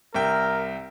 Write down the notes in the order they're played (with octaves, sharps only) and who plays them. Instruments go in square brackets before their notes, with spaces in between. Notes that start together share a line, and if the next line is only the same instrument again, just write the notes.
[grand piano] C2 E5 G5 [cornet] A#4